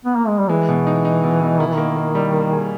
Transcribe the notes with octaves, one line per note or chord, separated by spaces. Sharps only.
B3
A#3
G#3
G3
E3 G#3
B2
D#4
D#4
B2
B2
D#3 E4
E3
D#3 A#3
A#3
G3
A#3
G#4